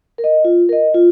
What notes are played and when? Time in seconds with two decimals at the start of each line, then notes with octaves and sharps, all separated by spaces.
0.18 A#4
0.24 D#5
0.45 F4
0.69 A#4 D#5
0.94 F4